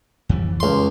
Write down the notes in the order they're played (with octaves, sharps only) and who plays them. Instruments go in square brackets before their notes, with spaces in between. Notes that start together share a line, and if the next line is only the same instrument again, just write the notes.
[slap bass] F2 E3 G3
[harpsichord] C#2 C6